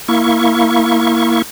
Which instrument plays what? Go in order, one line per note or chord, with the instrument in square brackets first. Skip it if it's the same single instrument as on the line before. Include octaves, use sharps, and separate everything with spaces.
[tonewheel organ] A#3 E4 C#6